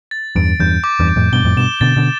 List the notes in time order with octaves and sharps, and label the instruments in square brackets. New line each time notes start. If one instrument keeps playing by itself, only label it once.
[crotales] A6
[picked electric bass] E2 G2 [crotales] D7
[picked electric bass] E2 G2 [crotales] G6
[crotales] D6
[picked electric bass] E2 G2
[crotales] D6
[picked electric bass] F2 A2
[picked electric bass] G2 B2 [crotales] G7
[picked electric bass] F2 A2
[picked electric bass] G2 B2 [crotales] E7
[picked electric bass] B2 D3 [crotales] A6
[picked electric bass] B2 D3